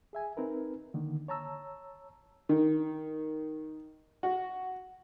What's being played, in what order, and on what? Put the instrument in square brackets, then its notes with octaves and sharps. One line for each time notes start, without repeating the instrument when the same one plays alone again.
[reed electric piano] G#4 E5 G#5
C4 D#4 A#4 B4
D3 D#3 A#3
C#5 A5 A#5 E6
[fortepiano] D#3
F#4